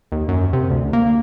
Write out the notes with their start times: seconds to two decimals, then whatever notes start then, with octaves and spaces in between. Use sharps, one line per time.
0.12 D#2
0.28 F#2
0.53 C3
0.70 D2
0.93 A#3